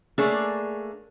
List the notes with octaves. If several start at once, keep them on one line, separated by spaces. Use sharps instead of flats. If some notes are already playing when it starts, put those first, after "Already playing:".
A3 A#3 D4 G#4 C#5